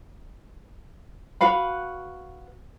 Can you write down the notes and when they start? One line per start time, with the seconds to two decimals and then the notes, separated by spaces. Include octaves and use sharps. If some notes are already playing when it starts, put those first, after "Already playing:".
1.41 F#4 B4 F5 B5